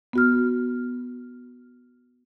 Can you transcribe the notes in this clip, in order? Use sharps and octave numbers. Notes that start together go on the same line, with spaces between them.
B3 F#4 F6